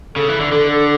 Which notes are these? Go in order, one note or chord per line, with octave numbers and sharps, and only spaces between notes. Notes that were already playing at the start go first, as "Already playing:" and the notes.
C#3 A4
E3
D3
D3 A4
A4